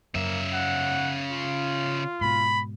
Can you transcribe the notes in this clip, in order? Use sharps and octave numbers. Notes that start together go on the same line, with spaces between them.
F#2 C#3 A#3 E5
F#5
F4
G#2 B2 B5